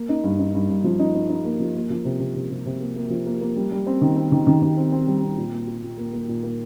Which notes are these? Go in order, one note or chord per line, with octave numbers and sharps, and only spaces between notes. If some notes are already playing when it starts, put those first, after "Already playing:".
Already playing: A#3
D#4
G2
D#4
G2
G2
F3
D#4
D#4
D#4
A#3
F3
A#3
F3
C3
C3
C3
C3
C3
A#3
A#3
F3
A#3
A#3
G3
G3
C4
D#3
C4
D#3
D#3
D#3
C4
C4
G3
C4
A#2
A#3
F4
A#2
A#3
A#3
A#2
A#3